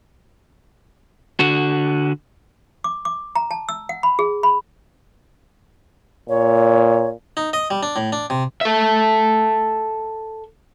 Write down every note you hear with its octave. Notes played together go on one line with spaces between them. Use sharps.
D3 F#4
D6
D6
A#5
A5
E6
F#5
B5
G#4
B5
A#2 C#5
D#4
D#5
G3
D4
A2
D4
C3
A4 E5